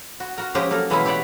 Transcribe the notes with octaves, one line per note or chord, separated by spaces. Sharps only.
F#4
F#4 A#4
F3 G#3 A#3 C#4 G4 D#5
F#3 A#3 A4 A#4
B2 E3 G#3 A#3 C#4 E4
E4 G4 C#5 D5 E5 F#5